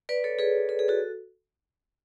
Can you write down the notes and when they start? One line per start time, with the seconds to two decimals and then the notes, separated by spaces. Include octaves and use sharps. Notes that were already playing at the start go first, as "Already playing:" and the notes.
0.09 B4 D5
0.24 A4 C#5
0.39 G#4 B4
0.69 A4
0.79 G#4
0.88 F#4 A4